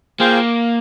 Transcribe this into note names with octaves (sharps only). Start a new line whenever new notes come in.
A#3 F4 G#4 C5 G5